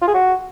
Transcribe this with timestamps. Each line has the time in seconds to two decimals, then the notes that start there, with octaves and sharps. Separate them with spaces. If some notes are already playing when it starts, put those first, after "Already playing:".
0.02 F4
0.08 G#4
0.14 F#4